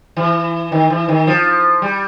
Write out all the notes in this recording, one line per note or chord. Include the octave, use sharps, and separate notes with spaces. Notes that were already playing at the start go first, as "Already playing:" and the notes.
E3
D#3
E3
D#3
F3
G3